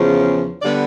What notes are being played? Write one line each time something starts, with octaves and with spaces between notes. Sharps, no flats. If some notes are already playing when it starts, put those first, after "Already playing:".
Already playing: E2 C#3 F3
D3 G3 B3 D5